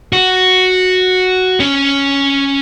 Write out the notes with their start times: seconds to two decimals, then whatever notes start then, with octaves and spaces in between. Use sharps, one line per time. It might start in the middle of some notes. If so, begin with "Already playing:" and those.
0.13 F#4
1.60 C#4